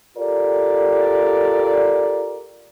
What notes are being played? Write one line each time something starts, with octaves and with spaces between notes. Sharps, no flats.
F4 G4 A4 A#4 D5